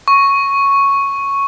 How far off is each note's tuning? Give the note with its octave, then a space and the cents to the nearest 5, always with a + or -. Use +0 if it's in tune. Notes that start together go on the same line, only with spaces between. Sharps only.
C#6 +0